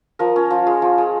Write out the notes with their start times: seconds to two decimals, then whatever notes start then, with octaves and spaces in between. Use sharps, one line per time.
0.19 F3 A#4
0.36 C#4
0.51 F3
0.67 G#3
0.82 F3
0.98 G#3